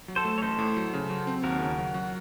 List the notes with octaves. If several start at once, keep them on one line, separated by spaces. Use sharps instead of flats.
F#3
A4 C5
A3
C#5
A1 A4 C5
A2
F#3
C#3
F#3
C4
D#2 F#4 A#4
C#3
F#3
F#3